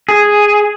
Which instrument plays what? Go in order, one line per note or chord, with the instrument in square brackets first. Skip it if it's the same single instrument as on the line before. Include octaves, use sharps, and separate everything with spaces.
[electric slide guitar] G#4